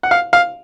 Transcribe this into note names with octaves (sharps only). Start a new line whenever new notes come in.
F#5
F5
F5